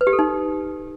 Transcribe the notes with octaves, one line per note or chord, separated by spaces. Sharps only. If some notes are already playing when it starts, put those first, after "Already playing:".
B4
G4
A4
D#4